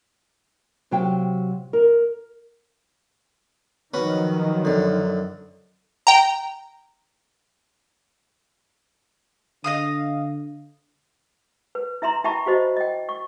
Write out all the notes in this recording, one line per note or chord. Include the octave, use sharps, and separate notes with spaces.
C3 F#3 F5 G5
A#4
D#3 F3 F#3 C#4 F#4 B4
F#2 D3
G5 A#5
D3 D#5 F5 D#6
B4
E4 E5 A#5 C6
E4 E5 G5 A5 B5 C#6
F4 F#4 C5 D#5
D#5 G5
C#6